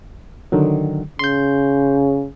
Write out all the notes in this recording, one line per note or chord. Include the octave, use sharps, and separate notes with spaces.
D3 D#3 F#3
C#3 C6 G6